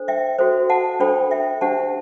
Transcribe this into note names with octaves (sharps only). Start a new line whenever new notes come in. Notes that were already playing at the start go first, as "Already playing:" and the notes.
Already playing: D4 A4 C5
E5 G5
F#4 A4 C5
F#5 A5
D4 A4 C5 G5 B5
E5 G5
D4 G4 C5 F#5 A5